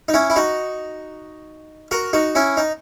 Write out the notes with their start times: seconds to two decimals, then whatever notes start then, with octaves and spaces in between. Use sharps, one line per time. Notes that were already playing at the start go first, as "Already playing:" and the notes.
0.08 D#4
0.14 C#4 E4
0.30 E4
0.36 D#4 F#4
1.91 F#4 A#4
2.13 D#4 F#4
2.35 C#4 E4
2.57 D#4